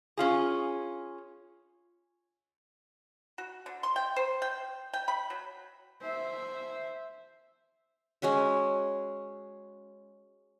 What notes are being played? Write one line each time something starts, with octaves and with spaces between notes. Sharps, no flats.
C#4 F4 G#4
F#4
D3
C6
G5
C5
G5
G5
B5
F#3
C5 E5
G#3 C#4 F#4 E5